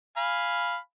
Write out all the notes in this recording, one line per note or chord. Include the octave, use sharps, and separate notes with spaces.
F5 G#5 B5